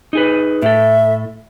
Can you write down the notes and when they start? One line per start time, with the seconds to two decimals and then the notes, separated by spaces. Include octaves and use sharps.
0.13 D#4 G#4 B4
0.62 A2 A4 E5